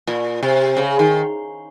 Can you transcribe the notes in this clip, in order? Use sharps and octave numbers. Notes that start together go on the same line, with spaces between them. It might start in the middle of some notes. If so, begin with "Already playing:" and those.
A#2
C3
C#3
D#3